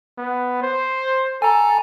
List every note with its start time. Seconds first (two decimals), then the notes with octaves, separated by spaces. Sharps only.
0.18 B3
0.62 C5
1.42 A4 G#5 A#5